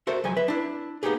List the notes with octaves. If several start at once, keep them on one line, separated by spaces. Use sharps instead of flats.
F#4 A4 A#4 C5 E5
C#2 F3 F#3 G#5
B4 E5
D4 E4
A#3 B3 D#4 G4 G#4